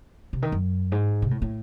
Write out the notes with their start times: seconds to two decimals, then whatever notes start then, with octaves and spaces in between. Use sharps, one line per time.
0.33 C3
0.42 D#3
0.52 F#2
0.92 G#2
1.22 C3
1.31 A2
1.42 A2